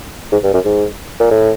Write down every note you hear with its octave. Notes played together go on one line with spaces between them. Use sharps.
G#2
G2
F#2
G#2
A#2
A2